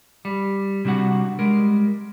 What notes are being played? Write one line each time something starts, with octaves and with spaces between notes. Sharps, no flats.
G3
C3 G3 D4 F#4 F#5
G3 G#3 A#4